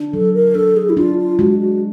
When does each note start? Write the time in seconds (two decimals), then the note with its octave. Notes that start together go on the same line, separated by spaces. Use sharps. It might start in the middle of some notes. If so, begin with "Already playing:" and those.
Already playing: D4
0.13 F#3 A4
0.34 A#4
0.55 D4 A4
0.77 G#4
0.90 E4
0.97 D4 F4
1.18 F4
1.39 G#3 F#4
1.59 F#4